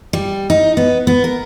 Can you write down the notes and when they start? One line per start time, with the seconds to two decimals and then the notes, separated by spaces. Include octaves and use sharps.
0.13 G3
0.50 D#4
0.77 B3
1.07 B3
1.24 A#4